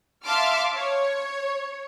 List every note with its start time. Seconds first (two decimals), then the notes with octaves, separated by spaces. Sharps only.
0.24 E5 F5 A5 C6 D6 F6
0.75 C#5